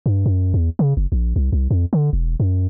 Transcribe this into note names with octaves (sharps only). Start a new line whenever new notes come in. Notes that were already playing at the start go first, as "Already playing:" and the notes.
G2
F#2
E2
C#3
F#1
A#1
C2
C2
F2
D3
E1
F#2